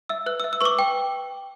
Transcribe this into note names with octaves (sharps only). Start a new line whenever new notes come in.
E5 E6
B4 F#6
E6
E5
E6
B4 C#6 D6
G5